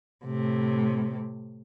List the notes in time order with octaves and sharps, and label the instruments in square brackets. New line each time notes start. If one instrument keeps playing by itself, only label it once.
[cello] A2 C3